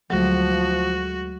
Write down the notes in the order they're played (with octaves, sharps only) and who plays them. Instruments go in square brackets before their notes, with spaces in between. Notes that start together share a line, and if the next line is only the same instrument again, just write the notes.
[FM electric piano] D2 G#3 A3 [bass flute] F3 [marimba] F#3 [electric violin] F#4